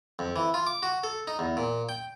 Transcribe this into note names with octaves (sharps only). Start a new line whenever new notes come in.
F2
E3
F4
D6
F#4
A4
D#4
E2
A#2
G5